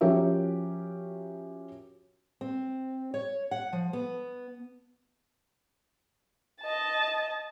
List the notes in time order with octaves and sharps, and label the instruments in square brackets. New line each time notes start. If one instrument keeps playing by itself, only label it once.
[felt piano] F3 C#4 F#4 G4 A#4 E5
[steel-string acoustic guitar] C4
C#5
F#5
F3
B3
[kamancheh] D#5 A5